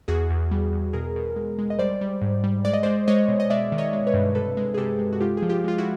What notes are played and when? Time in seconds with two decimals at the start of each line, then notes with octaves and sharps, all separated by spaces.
0.08 E2 F#4 G#4
0.30 E2
0.51 G3
0.72 E2
0.93 B2 G#4 A#4
1.16 B2
1.36 G#3
1.58 G#3
1.70 D#5
1.79 G3 C5 D5
2.01 G3
2.22 G#2
2.44 G3
2.65 G#3 D5
2.73 D#5
2.83 G#3 C5 D5
3.08 G#3 C#5 D#5
3.28 B2
3.40 D#5
3.50 G#3 D5 E5
3.72 D#3
3.78 C#5 D#5
3.93 G#3
4.07 B4 C#5
4.14 G2
4.35 C3 A4 B4
4.57 G#3
4.74 G#4
4.78 C3 G4 A4
4.99 G#3
5.13 F#4
5.21 G#3 F4 G4
5.37 G#4
5.42 F3
5.49 F4 G4
5.64 G#3 F4
5.78 E4 F#4